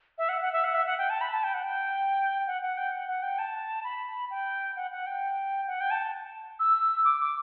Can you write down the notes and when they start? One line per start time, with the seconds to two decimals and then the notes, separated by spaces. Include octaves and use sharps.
0.18 E5
0.29 F#5
0.41 F#5
0.53 E5
0.64 F#5
0.75 E5
0.86 F#5
0.98 G5
1.10 A5
1.21 B5
1.32 A5
1.44 G5
1.54 F#5
1.63 G5
2.47 F#5
2.62 F#5
2.77 G5
2.92 F#5
3.08 F#5
3.23 G5
3.39 A5
3.84 B5
4.30 G5
4.76 F#5
4.91 F#5
5.07 G5
5.67 F#5
5.81 G5
5.91 A5
6.60 E6
7.05 D6
7.20 D6